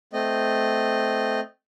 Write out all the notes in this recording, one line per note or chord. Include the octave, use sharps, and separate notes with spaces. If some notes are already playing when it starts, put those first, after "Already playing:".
A3 C4 D#5